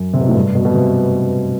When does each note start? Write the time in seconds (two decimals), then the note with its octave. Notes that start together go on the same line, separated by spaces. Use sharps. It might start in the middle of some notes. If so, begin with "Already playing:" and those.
Already playing: F#2
0.13 C3
0.21 B2
0.28 A2
0.35 G2
0.55 B2
0.65 B2
0.74 C3